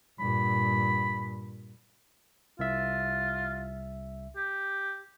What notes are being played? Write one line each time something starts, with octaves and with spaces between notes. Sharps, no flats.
G2 A#2 B5
C2 F4 E5
G4